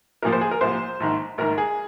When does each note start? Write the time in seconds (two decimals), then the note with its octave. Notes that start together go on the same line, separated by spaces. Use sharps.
0.22 C2 A#2 F3 A#4
0.33 C5
0.41 G#4
0.51 A#4
0.61 C2 A#2 F3 C5
1.00 A#1 G#2 D#3
1.38 A#1 G#2 D#3 A#4
1.58 G#4